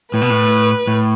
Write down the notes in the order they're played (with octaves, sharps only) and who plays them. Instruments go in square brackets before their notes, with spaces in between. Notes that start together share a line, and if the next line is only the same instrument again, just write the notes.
[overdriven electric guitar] A2 [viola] B4
[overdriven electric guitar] B2
A2
A2